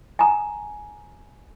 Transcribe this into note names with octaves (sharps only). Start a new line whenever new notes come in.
G#5 A#5